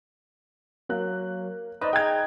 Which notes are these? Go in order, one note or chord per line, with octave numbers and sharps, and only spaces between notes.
F#3 A#3 F#6
D#4 B4 C5 D5 D#5
G#4 G5 A#5 F#6 G#6